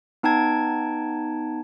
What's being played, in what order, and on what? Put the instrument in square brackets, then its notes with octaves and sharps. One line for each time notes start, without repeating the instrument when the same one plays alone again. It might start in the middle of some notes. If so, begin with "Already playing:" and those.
[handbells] B3 D#4 G5 A5 G#6